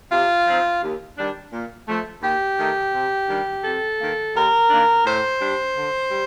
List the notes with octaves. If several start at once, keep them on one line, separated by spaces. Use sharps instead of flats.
C3 F4
F3 C4 D#4
D#2
D#3 G3 D4
A#2
F3 A3
D#2 G4
D#3 A3 D#4
C3
D#3 G3 D4
F2 A4
D#3 A#3
D#2 A#4
D#3 A#3 D4
A2 C5
G3 D4
D3
G3